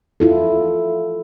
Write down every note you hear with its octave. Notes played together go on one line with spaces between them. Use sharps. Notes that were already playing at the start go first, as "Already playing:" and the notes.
E4 F4 A4